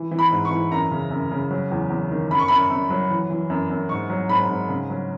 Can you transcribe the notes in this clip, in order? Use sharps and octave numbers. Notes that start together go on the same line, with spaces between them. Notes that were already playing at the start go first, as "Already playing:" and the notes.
Already playing: E3
E3
B5
G#2
C#6
E3
F#2 A#5
C#3
F#2
C#3
F#3
E2
E2
D#3
F#2 B5
C#6
F#2 B5
F#2
F#3
E3
E3
F#2
F#2
G#2 C#6
F#3
G#2 B5
G#2
C#3
F#3